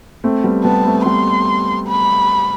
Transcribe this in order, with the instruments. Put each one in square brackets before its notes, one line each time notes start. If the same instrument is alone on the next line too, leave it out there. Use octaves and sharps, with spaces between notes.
[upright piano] A3 C4
G3 B3
[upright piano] G3 B3 [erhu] A5
[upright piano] A3 C4
[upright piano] G3 B3 [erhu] C6
[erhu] B5